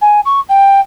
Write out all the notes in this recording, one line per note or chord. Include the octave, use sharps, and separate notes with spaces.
G#5
C#6
G5